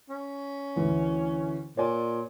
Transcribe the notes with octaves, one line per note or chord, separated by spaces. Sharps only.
C#4
D2 E3
A#2 C#5 D5 G#5